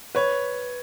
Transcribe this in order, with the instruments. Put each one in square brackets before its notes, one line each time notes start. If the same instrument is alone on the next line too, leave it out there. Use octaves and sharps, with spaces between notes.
[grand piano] B4 C#5